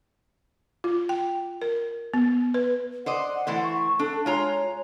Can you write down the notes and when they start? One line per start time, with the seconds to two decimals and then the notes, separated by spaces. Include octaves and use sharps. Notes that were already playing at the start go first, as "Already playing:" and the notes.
0.84 F4
1.09 G5
1.62 A#4
2.14 B3
2.54 B4
3.06 C5 D5 D#5 F#5
3.47 E3 A3 C5
3.63 C#6
3.99 D4 A4
4.26 G#3 F4 C#5 A#5